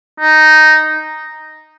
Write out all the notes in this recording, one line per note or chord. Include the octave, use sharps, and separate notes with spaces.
D#4